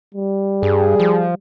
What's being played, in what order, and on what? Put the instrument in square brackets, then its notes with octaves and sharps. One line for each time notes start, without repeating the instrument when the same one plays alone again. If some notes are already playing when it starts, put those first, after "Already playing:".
[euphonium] G3
[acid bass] G2 [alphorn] G#4
[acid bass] F3